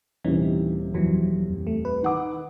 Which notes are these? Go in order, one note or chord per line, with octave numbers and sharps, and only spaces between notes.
D#1 C3 E3 C#4 D#4
F2 E3 F#3
A3
B4
D#3 F#5 D6